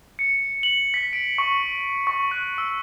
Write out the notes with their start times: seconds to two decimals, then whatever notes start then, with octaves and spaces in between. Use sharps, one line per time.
0.19 C#7
0.63 F#7
0.94 B6
1.13 D7
1.38 C#6
2.07 C#6
2.31 F#6
2.58 E6